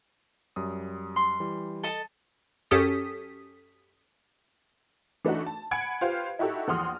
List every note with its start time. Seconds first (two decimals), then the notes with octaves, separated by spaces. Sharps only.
0.56 F#2 G3 D#6
1.16 C6
1.40 E3 G3
1.84 A4 D#5 A5
2.71 F#2 C#4 G4 A4 D#6 B6
5.25 E3 A3 D4 D#4 F#4
5.46 A5
5.71 F#5 G#5 B5 G#6 C#7 D7
6.01 F4 G4 B4 C5 F5
6.39 D#4 E4 F#4 G4 A4
6.68 A#1 E2 F#5 C6 D#6 F6